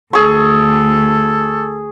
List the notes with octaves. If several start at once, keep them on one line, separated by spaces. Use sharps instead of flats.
D2 G#4 A4 C#6